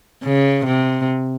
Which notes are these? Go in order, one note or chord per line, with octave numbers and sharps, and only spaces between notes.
C#3
C3